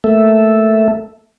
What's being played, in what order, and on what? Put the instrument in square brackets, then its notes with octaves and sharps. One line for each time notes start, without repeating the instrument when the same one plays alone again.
[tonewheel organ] A3 A#3 A4 E5